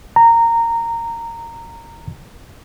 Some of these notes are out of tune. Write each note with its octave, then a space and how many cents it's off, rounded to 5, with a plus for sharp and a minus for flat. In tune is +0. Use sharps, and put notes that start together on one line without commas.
A#5 -15